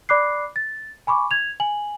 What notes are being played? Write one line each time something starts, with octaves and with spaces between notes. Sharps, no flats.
D5 B5 D6 F#6 C7
A6
G#5 B5 C#6 D6
G#6 F7
G#5 F#7